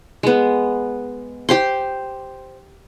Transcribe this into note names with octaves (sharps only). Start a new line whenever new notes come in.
G#3 B3
G4 C5 C6